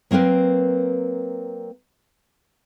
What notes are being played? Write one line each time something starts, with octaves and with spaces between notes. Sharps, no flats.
F#3 A#3 C4 A#4 B4